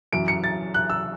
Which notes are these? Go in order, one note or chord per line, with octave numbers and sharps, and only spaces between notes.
F#2 E3 D7
C#7
A6
F#6
E6